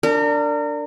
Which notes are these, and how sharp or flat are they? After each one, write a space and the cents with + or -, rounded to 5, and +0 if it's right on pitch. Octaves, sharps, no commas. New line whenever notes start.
D4 +0 A#4 -30